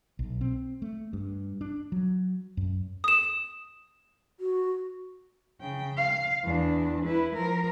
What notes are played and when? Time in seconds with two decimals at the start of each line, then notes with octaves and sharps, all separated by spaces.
0.19 B1
0.41 C4
0.82 A3
1.13 G2
1.61 D4
1.92 F#3
2.57 F#2
3.04 D#6 E7
4.40 F#4
5.61 C#3 G5
5.97 F5
6.44 E2 D4
7.06 E4 B4
7.34 F3 A#4